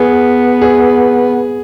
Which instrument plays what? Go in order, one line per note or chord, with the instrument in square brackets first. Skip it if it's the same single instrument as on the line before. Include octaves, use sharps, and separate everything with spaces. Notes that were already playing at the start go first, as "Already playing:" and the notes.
Already playing: [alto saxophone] B3 [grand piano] G#4
[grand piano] G#4